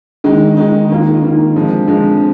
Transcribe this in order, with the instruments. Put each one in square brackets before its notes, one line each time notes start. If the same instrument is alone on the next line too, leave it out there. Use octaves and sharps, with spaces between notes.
[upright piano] D#3 G#3 D#4
D#3 G#3 D#4
D#3 A#3 F4
D#3 A#3 F4
D3 F3 G#3 C4
D3 F3 G#3 C4